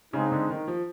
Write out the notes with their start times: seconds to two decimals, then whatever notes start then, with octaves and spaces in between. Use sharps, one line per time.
0.12 C#3 G#3 C4 D#4
0.32 D3
0.50 D#3
0.67 F3